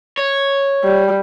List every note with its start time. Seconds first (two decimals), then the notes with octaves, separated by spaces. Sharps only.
0.17 C#5
0.83 G3